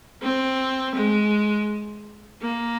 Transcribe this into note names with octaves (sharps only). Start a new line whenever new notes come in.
C4
G#3
A#3